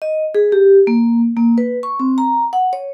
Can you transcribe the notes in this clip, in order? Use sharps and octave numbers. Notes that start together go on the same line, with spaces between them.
D#5
G#4
G4
A#3
A#3
B4
C#6
C4
A#5
F#5
C#5